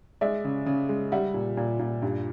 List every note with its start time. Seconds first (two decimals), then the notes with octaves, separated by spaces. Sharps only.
0.21 G#3 D5 E5
0.44 C#3
0.66 C#3
0.89 G#3
1.12 G3 E5 F#5
1.34 A#2
1.57 A#2
1.79 A#2
2.02 G2